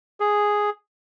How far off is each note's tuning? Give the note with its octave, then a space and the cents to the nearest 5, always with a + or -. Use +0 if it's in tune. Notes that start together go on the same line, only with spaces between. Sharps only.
G#4 +0